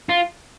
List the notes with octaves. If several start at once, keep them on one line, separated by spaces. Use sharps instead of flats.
F4